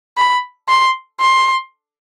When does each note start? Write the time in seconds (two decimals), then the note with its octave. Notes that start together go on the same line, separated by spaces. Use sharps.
0.17 B5
0.69 C6
1.20 C6